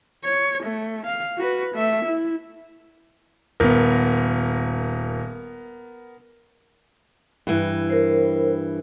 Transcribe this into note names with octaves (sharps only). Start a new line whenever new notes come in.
C#5
A3
F5
F#4 B4
A3 E5
E4
D#1 B3 A#4
G2 E3
A#4 C5